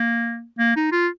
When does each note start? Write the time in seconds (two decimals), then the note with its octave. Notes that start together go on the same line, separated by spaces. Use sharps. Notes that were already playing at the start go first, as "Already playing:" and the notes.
Already playing: A#3
0.58 A#3
0.76 D#4
0.92 F4